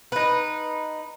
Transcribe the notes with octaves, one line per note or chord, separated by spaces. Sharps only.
D#4 B4